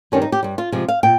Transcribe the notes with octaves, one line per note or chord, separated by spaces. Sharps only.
G2 D#3 G3 C#4
D#4
G4
G2 G3
F4
C3 F3 G#3
F5
A#2 G5